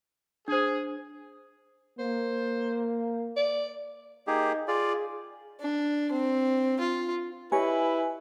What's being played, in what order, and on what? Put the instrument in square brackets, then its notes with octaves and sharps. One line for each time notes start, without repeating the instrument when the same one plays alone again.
[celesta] D4 C5 [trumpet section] G#4
[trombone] A#3 [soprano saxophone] C5
[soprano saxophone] D5
[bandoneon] A#3 G4 G#4 [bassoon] D#4
[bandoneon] F4 D5 [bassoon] G#4
[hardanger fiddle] D4
C4
F4
[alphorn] E4 [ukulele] G4 C#5 D#5 [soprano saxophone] B4 [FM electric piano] G#5